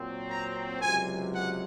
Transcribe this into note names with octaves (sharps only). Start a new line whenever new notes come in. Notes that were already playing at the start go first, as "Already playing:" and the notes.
Already playing: A#2 F#3 C4
A#5
C#2 C3 F#3 G#5
F#5